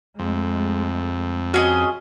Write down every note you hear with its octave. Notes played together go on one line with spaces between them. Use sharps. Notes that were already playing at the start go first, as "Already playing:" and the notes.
F2 G#3 A3
C#4 F#4 G#4 D#5